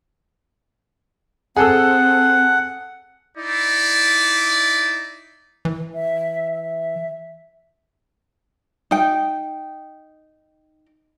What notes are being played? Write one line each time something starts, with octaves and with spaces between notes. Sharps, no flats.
C4 G#4 A4 F#5 E6
D#4 E4 D5
E3
E5
E5
D#4 G5